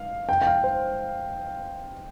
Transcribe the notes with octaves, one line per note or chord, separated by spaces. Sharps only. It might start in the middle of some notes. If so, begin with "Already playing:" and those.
Already playing: F5
G5
G5
F5
C5